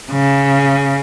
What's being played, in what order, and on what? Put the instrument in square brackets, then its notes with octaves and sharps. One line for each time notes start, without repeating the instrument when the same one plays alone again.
[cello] C#3